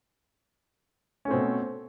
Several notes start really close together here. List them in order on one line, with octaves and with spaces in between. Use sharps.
C#4 A3 C4 B2